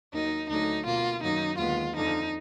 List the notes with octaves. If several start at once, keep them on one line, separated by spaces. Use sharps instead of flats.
D#2 D#3 F#3 D#4
D2 D3 F#3 D#4
B2 A#3 F4
F#2 D#3 F#3 A#3 D#4
D#2 D3 G#3 B3 F4
F2 D3 F3 D#4